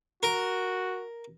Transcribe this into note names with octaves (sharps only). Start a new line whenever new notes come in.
F#4 A#4